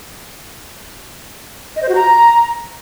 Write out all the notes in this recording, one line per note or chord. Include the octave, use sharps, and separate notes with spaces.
D#5
C5
F#4
A#5